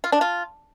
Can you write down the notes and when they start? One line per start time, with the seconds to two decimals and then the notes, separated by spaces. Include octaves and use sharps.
0.04 F4
0.12 D4
0.21 F4